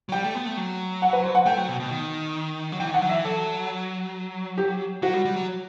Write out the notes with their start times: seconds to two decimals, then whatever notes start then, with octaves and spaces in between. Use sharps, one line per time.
0.09 F#3
0.12 G3 G5
0.24 A3
0.35 B3
0.46 A3
0.57 F#3
1.02 F#5
1.13 B4
1.24 C5
1.35 F#5
1.46 A3 G5
1.57 F#3
1.68 B2
1.80 B2
1.91 D#3
2.72 F#3
2.80 E3 G5
2.91 D#3 F#5
3.02 F#3
3.09 E5
3.13 E3
3.24 F#3 A4
4.58 G4
5.02 F#3 F#4
5.14 G3
5.25 G3
5.36 F#3